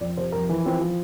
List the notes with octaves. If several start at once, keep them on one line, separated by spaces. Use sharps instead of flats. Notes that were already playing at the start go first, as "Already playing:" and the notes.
F2 D5
C3 C5
F2 A#4
E3
F3 C4
F3